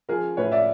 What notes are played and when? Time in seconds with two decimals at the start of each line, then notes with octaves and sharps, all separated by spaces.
0.09 F3 G#4 A#4
0.37 A2 B4 C#5
0.52 D5 E5